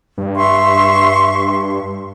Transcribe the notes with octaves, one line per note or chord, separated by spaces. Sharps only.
G2
E5 C6 C#6